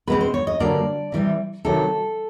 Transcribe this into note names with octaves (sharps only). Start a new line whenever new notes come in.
B2 G#3 C4 B4
C5
C#5
D#5
G2 D3 F#3 A#3 D5
C3 E3 G3 C4
C3 D#3 F#3 A4